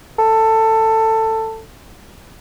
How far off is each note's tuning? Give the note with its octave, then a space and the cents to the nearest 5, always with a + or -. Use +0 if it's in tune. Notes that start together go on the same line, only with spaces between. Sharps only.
A4 +15